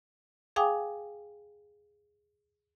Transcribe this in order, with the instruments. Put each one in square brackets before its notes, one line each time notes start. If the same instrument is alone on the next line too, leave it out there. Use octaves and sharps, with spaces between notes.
[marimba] G#4 F5 G5 G#5 D6 D#6